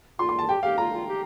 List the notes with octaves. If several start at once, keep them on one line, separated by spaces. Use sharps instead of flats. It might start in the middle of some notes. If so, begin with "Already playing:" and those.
F4 C6
C6
A5
G4 G5
G4 F5
F4 A#5
F4
G4